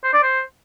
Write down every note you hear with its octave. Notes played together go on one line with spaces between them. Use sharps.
C5
D5
C5